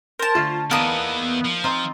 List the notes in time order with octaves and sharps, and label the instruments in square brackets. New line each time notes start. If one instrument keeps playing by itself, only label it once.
[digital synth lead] A#4 [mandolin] C5 A5
[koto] D3 A3 [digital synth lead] F4
[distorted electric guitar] E2 E3 [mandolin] A#3 D#6 [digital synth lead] B3 [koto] D#4 D5 A5
[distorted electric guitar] F3
[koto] C4 D#4 F4